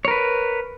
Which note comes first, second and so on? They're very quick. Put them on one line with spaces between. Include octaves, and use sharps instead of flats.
C#5 A#4 B4